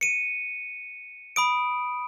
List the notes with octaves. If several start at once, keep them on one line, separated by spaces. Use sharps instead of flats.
C#7 D#7
B5 D#6 D7